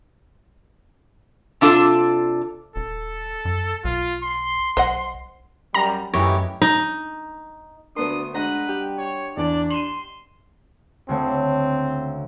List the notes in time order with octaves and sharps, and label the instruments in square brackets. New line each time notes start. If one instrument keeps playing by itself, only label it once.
[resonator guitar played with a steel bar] C3 D4 F4 A4
[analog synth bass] D#1 [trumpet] A4
[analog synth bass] F#2
[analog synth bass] B1 [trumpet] F4
[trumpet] C6
[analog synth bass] B1 [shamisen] C5 D#5 F#5
[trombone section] F#2 G3 [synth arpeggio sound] A#5
[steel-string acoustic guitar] F#2 [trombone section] A2 D#3 E3 [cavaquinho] G4 C#5 D#5
[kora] D#4
[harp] D2 B3 C6 [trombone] D4 [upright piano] A#4 B4 [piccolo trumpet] D#6
[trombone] G#3 [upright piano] D4 [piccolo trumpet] B4 [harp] D#5 F#5 A#5
[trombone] G3 [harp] G4
[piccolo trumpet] C#5
[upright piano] E2 [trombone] D4 [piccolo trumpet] D5
[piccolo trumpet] C6 [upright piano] D#7 E7 F#7
[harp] D2 C#3 A3 [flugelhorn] C4